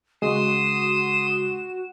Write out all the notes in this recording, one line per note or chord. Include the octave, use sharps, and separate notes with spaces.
C#3 G#3 F#4 C6 D#6 E7